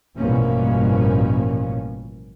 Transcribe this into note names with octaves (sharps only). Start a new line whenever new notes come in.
A1 G2 B2 F3 A#3 C#4